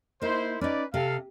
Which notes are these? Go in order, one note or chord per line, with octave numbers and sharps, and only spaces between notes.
A#3 D#4 E4 C5
C#4 D#4 B4 D5
C3 A4 F5